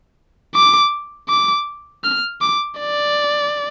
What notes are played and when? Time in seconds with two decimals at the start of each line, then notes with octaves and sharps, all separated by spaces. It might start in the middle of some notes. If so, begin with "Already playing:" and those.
0.55 D6
1.29 D6
2.04 F6
2.41 D6
2.80 D5